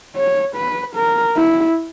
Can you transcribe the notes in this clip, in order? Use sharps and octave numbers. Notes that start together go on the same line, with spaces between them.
C#5
B4
A#4
E4